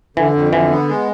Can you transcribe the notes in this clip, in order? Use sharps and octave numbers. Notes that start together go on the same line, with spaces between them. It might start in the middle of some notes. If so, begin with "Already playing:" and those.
D3 E3
F2
D3 E3
B3
G#3